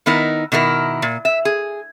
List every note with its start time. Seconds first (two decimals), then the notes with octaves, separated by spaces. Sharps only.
0.06 D#3 B3 D#4 E4 A#4
0.52 B2 D#3 E4 A#4
1.02 A#2
1.25 E5
1.45 G#4